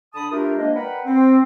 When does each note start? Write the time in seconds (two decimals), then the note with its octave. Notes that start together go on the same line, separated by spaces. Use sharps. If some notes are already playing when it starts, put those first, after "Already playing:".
0.14 D3 A5 B5 D#6
0.31 A3 D4 F4 G4 A#4
0.57 F3 G#3 A#3 D4 C5 D#5
0.75 A#4 B4 D5 F#5 G5 B5
1.05 C4